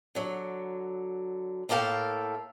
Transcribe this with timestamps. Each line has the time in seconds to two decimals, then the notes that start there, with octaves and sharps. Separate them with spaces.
0.15 D3 F#3
1.69 A2 A#3 A4 F5 G5